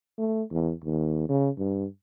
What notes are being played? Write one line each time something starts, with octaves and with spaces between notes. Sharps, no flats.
A3
E2
D#2
C#3
G2